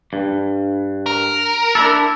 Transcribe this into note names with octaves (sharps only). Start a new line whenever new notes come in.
G2
A#4
D4 E4 A4